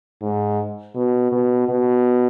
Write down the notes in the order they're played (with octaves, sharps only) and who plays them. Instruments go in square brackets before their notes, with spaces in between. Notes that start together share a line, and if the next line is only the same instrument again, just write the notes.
[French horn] G#2
B2
B2
B2